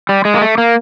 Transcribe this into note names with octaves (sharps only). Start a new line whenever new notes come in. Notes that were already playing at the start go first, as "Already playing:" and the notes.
G3
G#3
A#3
A3
A#3